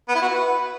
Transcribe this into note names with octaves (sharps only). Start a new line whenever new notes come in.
B3
E4
F#4
B4